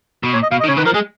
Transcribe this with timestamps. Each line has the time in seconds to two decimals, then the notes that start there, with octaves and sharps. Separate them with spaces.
0.23 B2
0.33 A#2 C#5
0.43 D#5
0.51 B2 F5
0.60 D#5
0.64 D#3
0.68 C#3 C#5
0.77 D#3 B4
0.85 F3 A#4
0.94 G#3 G#4